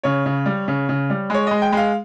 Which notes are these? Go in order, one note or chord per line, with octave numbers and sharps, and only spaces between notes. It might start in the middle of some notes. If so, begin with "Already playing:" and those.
C#3 C#5
C#3
G3
C#3
C#3
G3
G#3 C#5
G#3 D#5
G5
G#3 F5